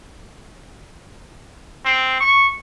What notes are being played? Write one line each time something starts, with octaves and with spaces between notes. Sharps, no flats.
C4
C#6